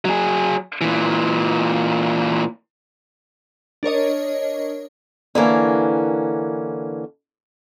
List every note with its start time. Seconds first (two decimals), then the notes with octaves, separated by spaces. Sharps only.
0.05 F#3 G#4
0.81 A#2 E3
3.83 D4 A#4 C#5 D#5
5.35 D3 E3 A#3 C#4